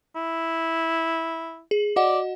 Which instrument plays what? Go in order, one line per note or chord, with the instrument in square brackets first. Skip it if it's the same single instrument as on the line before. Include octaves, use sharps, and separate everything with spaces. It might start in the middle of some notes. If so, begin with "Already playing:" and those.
[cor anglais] E4
[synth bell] G#4
[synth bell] F#4 D#5 F#5 [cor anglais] D5